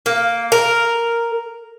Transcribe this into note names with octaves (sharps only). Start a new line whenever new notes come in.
A#3
A#4